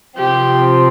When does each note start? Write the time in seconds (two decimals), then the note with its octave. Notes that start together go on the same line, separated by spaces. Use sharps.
0.19 C3 F3 C4 G4